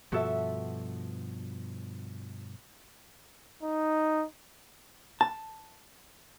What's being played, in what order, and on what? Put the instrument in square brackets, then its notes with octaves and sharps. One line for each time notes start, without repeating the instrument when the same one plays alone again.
[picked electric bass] G2 B2 F3 [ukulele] F#4 A4 E5
[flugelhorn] D#4
[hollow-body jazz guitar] A5